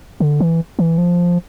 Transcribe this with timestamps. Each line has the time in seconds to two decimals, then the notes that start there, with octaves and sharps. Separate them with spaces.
0.20 D3
0.40 E3
0.79 E3
0.98 F3